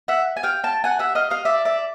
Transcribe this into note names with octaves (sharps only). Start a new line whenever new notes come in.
E5 F#5
G#5
F5 G5
G5 A5
F#5 G#5
E5 F#5
D#5 F5
D#5 F5
D5 E5
D5 E5